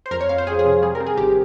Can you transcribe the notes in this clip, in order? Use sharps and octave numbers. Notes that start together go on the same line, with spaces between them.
C5
F2 A#4
C#5
F2 F5
C5
F2 G#4
G#4
C3
G3 G#4
A#4
C4
G#4
G#1 G4